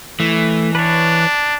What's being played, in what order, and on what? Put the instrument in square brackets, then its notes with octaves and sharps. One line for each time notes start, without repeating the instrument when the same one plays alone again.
[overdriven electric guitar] E3 [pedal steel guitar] A3
[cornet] D4 [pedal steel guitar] B4 C#5